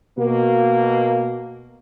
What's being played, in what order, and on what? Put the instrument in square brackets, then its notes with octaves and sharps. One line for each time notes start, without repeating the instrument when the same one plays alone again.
[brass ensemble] B2 A#3